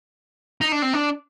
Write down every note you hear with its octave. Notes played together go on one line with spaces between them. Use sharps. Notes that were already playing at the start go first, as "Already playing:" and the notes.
D#4
D4
C4
D4